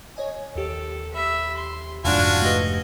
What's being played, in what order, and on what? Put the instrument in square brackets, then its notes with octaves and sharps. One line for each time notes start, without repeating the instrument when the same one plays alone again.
[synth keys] C#5 D#5 G#5
[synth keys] D#2 G4 [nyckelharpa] A4
[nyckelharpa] E5 B5
C6
[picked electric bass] F1 G#2 [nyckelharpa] D4 [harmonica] F4 F#4 G#5 [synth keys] F5 A5
[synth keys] A3 G4 B4 [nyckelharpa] D#5